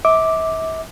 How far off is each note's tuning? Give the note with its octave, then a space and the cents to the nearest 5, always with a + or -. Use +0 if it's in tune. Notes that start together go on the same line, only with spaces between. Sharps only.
E5 -40 D6 +0